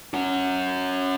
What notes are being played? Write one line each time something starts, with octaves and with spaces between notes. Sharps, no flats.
C#4 F#4